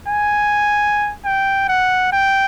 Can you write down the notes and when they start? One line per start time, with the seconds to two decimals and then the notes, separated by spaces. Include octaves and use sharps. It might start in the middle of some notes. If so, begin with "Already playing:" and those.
0.08 G#5
1.25 G5
1.69 F#5
2.13 G5